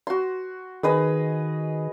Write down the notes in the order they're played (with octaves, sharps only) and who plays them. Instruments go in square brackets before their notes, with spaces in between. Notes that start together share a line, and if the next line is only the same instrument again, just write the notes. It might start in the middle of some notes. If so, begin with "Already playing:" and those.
[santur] F#4 C6
[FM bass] D#3 [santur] G#4 B4 D#5